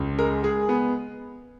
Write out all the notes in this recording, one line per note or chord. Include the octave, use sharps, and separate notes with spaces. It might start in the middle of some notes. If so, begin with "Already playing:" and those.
Already playing: C#2
G#3 A#4
G#3 G#4
B3